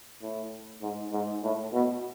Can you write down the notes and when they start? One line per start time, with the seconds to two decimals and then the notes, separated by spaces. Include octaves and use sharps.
0.22 A2
0.82 G#2
1.12 G#2
1.43 A2
1.73 B2